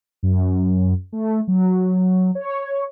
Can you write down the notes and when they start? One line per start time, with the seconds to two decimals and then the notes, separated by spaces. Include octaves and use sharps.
0.23 F#2
1.12 A3
1.47 F#3
2.35 C#5